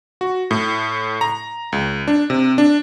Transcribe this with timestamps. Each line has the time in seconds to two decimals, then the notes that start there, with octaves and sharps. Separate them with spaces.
0.21 F#4
0.51 A2
1.21 A#5
1.72 C#2
2.08 D4
2.30 C3
2.58 D4